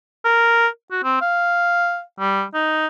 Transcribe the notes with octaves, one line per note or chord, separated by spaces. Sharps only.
A#4
F#4
C4
F5
G3
D#4